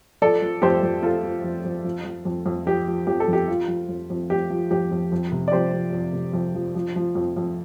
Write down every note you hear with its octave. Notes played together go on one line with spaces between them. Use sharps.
F3 A4 D5
F3
F2 G4 C5
F2
F3 F4 A4
F3
F2
F2
F3
F3
F2
F2
F3 G4
F3
F2 G4
A4
F2 G4
F3 F4
F3
F2
F2
F3 G4
F3
F2 G4
F2
F2
C3
D5
F2 G4 C5
F3
F2
C3
F2
F3
F3
F3
F2
F2